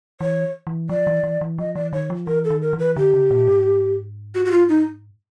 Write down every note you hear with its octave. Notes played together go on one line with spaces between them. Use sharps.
E3 C#5
E3
F3 D5
E3
E3
E3
F3 D#5
E3 D5
D#3 C#5
F3
E3 A#4
A4
D#3
A#4
E3
B4
D3 G4
C#3
A#2
G#2
F#4
F#4
F4
D#4